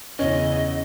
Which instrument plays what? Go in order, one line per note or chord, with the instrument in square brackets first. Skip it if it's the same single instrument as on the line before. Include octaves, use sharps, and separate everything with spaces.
[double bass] E2 C#3 [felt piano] C#4 [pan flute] D#5